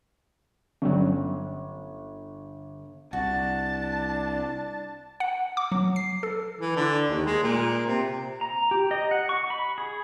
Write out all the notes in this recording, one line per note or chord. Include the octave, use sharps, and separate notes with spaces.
G1 F#3 G3 C#4
C2 D4 F#4 A5
F#5
D6
F#3
C7
A4
E3
D3
D#2
G#3
A#2
C3
A#5
G4
D#5
F#5
C#6
B5
G#4